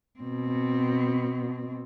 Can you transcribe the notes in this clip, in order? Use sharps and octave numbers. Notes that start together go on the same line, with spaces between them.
B2 C4